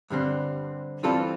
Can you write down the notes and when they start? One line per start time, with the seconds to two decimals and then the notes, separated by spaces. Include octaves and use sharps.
0.10 G2 D3 G3 C4
1.03 G2 E3 G3 C4 F4 A4